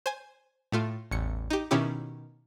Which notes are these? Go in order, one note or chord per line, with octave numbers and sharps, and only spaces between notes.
C5 G#5
A2 A3 F4
A1 E2 C#7
D#4 G4
B2 D#3 C#4 E4 G4